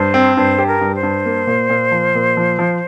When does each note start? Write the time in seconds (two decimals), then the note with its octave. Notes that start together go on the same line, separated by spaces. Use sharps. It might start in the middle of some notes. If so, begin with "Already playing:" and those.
Already playing: G2 C5
0.14 C4
0.37 G2 C5
0.58 G4
0.67 A#4
0.81 G2
0.95 C5
1.03 G2
1.25 A#3
1.47 A#2
1.70 A#2
1.92 F3
2.15 A#2
2.37 F3
2.59 F3